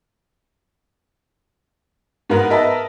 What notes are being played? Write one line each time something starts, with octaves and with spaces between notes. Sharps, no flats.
G#2 B3 A#4 B4
A#4 B4 D#5 E5 A5